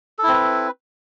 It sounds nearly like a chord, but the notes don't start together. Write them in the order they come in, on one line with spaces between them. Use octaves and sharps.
A4 E4 C4 B4